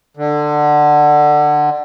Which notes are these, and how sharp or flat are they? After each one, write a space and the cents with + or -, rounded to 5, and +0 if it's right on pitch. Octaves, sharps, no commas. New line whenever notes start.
D3 +20